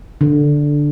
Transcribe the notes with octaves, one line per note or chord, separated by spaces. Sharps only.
D3